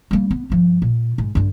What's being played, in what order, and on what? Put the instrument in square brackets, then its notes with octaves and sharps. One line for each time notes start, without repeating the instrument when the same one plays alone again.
[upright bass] G3 A#3
B3
G2 F3
A#2
G#2
G2 D3